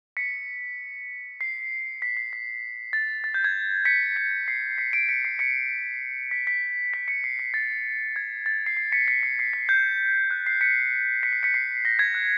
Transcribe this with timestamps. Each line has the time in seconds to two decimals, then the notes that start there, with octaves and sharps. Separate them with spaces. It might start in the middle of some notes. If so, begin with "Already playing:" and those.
0.17 B6 C#7
1.41 C7
2.02 B6
2.17 C7
2.33 B6
2.93 A6
3.24 A6
3.34 G6
3.44 G#6
3.85 B6 C#7
4.16 B6 C#7
4.48 C7
4.78 B6 C#7
4.93 C7 D7
5.09 B6 C#7
5.25 C7
5.39 B6 C#7
6.31 B6
6.47 B6
6.94 B6
7.08 B6 C#7
7.24 C7
7.39 B6
7.54 A6
8.16 G#6
8.46 A6
8.66 C7
8.77 C7
8.92 B6 C#7
9.08 B6 C#7
9.23 C7
9.39 C7
9.53 B6
9.69 G6
10.31 F#6
10.46 C7
10.61 B6 C#7
11.23 B6 C#7
11.33 C7
11.43 B6 C#7
11.54 C7
11.85 A#6
11.99 G#6
12.15 F#6